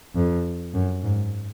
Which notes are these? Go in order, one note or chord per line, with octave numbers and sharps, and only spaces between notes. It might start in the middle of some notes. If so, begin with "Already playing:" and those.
F2
F#2
G#2